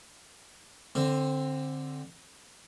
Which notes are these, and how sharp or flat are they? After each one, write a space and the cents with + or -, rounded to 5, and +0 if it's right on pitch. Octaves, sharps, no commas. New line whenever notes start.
D3 +0 C4 +10